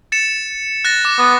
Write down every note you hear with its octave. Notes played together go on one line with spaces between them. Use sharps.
A6 C#7 E7
F#6 A6 A#6
D6
B3